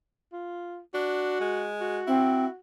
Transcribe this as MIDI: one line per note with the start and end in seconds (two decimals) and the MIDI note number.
0.33 0.79 65
0.94 1.39 62
0.94 1.71 66
1.40 2.01 56
1.81 2.58 66
2.07 2.45 60
2.07 2.48 64